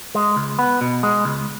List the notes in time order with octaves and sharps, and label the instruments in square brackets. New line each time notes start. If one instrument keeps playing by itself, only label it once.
[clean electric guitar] G#3
C#2
B3
B2
G#3
C#2